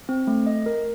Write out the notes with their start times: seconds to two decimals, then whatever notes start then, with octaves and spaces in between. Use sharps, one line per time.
0.09 C4
0.27 A3
0.46 D#5
0.66 A#4